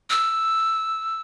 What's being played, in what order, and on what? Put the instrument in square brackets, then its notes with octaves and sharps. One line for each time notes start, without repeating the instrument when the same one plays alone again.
[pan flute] E6